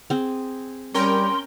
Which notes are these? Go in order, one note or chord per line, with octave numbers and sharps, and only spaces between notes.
C4 G#4
G3 C#4 A#4 G5 C6